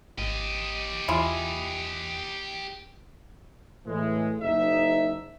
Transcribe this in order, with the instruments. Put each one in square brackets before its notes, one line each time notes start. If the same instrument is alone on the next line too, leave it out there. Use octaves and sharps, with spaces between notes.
[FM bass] G#1 [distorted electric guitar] G4 D#5
[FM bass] E2 [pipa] E4 F4 G#4
[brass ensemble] A2 E3 G#3
F#1 D#4 E5